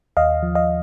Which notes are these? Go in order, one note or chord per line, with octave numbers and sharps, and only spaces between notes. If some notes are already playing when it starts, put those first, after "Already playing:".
D#2 D#5 F5
F3
D#5 F5